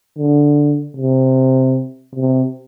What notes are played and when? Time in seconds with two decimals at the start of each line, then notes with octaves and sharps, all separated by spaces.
0.18 D3
0.97 C3
2.15 C3